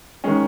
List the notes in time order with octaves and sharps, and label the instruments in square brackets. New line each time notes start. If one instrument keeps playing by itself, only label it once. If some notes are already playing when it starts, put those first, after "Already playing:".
[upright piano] D#3 G#3 C#4